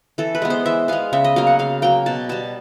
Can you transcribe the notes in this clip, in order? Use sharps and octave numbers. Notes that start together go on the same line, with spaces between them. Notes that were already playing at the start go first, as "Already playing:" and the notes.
E3 A4
B4
G#3 B3
C5
E3 E5
G#3 B3 F5
C#3 E5
D#5
F#3 A#3 F5
F#5
C#3 F5
F#3 A#3 G5
B2 A5
G3 B3 A5